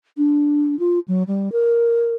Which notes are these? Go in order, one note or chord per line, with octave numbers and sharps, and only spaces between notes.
D4
F4
F#3
G3
A#4